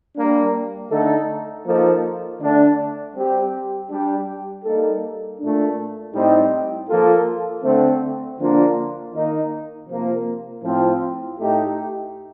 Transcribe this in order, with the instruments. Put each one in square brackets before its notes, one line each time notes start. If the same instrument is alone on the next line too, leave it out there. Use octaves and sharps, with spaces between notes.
[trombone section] G3 A#3 D4
D3 A3 D#4 A4
F3 A#3 D#4 A4
D3 A3 D4
G3 C4 G4
G3 D4 G4
G3 A#3 D#4 A4
A#2 A3 D4
A2 G3 C4 D#4
F3 A#3 F4 A4
D3 A3 C4
D3 F3 A#3 D4 F4
D#3 A#3 D#4
C3 F3 A#3 F4
A2 F3 C4 F4
A2 A3 D#4 G4